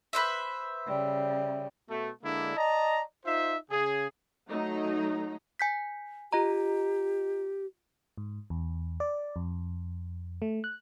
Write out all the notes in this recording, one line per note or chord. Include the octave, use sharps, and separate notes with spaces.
B4 C5 E5
C#3 G3
B2 A3
D3 G#3 A#3 D4 E4
D5 D#5 A5 A#5
D#4 F4 C5 E5
C#3 G#4
F#3 A3 D#4 A#5
G#5 G6 B6
F4 G4 D#5 A#5
G#2
E2
D5
F2
A3
F#6